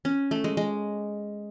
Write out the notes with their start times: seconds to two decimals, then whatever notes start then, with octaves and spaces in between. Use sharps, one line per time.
0.05 C#4
0.31 A3
0.44 G#3
0.57 G#3